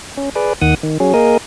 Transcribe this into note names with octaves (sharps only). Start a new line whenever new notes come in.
C#4
G#4 B4 D5
D#2 D#3 F#5 D#6
D#3
F#3 C#4 G#4
A#3 G#4 A#4 D#5